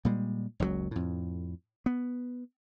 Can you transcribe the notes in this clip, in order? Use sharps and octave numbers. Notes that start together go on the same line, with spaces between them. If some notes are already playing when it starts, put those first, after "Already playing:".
A#2 G3 G#3
F#1 C#2 B2 F#3
F2 A2
B3